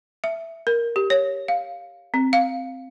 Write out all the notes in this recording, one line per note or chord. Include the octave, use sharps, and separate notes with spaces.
E5
A#4
G4
C#5
F5
C4
F5